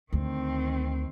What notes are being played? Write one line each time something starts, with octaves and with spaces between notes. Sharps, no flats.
D2 D#3 C4